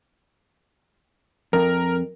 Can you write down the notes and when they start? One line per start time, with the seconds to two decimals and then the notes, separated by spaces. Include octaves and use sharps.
1.53 F2 A#4